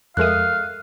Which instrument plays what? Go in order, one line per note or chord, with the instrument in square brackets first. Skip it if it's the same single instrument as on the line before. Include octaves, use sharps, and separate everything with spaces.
[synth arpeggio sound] F2 G#3 D#6 [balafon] A4 A#4 E5 [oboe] F5 [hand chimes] F#6